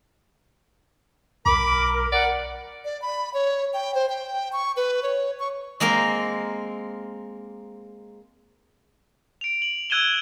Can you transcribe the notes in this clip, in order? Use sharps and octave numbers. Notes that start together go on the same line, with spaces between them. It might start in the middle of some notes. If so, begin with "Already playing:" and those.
B1 A#4 B5 D6
D5 F#5
D5
B5
C#5
G5
C5
G5
C#6
B4
C#5
C#6
G#3 A#3 C4 A#4
D7 F7
F#7
E6 F#6 G#6 D#7 E7 G7